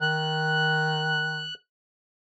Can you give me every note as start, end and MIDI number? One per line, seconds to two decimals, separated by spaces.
0.01 1.48 51
0.01 1.54 90